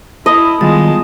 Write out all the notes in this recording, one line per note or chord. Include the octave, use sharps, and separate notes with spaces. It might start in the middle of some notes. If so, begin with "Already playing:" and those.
E4 D#5 A5 B5 D#6
D#3 G3 G#3 B3 F4 A5 A6